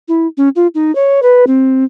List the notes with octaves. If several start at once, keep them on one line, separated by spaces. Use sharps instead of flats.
E4
C#4
F4
D#4
C#5
B4
C4